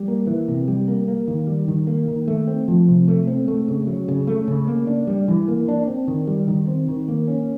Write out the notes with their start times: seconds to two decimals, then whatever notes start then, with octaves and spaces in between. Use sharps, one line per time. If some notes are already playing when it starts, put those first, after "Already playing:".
Already playing: G3
0.08 A#3
0.27 E3
0.48 C3
0.68 G3
0.88 A#3
1.08 A#3
1.28 D#3
1.47 G3
1.68 D#3
1.87 A#3
2.08 D#3
2.28 A3
2.47 C4
2.68 F3
2.88 C3
3.08 A3
3.27 C4
3.48 A3
3.68 C#3
3.87 F#3
4.08 C#3
4.27 A3
4.48 C#3
4.67 A#3
4.87 D4
5.07 G3
5.28 E3
5.48 A#3
5.68 D4
5.87 C4
6.08 D#3
6.27 G3
6.48 D#3
6.67 C4
6.88 D#3
7.08 A#3
7.28 C#4